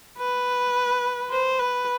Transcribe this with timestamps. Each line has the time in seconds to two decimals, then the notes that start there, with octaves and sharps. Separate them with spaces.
0.18 B4
1.31 C5
1.59 B4